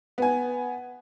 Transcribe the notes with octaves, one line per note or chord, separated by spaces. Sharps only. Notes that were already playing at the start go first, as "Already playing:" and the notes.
B3 G#5